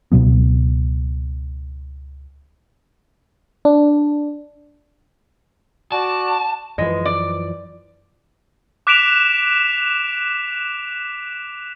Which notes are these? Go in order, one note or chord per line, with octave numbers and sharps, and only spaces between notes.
C#2 B2 F#3 B3
D4
F#4 D5 A5
F#2 E3 F3 G#3 B4 D#5
D5
D6 F#6 B6 D7 E7 F7